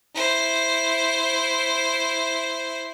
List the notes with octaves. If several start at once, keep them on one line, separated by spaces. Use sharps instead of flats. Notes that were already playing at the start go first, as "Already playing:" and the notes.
E4 C5